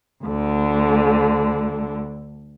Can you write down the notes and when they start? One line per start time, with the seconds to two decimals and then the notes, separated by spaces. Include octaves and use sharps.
0.25 D2 D3